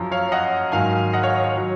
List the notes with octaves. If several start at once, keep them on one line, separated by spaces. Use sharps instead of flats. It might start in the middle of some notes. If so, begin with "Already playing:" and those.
Already playing: F#2 F3
C#5 F5
D#5 F#5
G#2 D#3 F#3 F5 G#5
D#5 F#5
C#5 F5
C#5
C#5
F#3